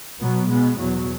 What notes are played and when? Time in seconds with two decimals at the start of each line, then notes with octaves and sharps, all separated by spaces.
0.20 B2 F#3 B3
0.49 B2 G#3 B3
0.77 E2 B2 F#3